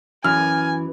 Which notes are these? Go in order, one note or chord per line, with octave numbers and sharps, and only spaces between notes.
F#2 E3 G#5 F6